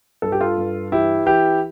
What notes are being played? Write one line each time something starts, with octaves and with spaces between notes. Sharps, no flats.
G2 A4
G4
F4 A4
G2
E3 E4 G4
E3 E4 G4